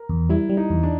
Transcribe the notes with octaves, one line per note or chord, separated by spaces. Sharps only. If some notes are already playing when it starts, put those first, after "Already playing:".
Already playing: A#4
E2
G3 E4
G3
D#4
E2
D4